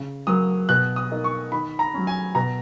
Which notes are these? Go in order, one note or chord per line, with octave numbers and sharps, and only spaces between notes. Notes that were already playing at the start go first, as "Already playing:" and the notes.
Already playing: C#3
F#3 A#3 D#6
B2 F#6
D#6
A#3 D#4
C#6
D#3 B5
A#5
F#3 C#4
G#5
B2 A#5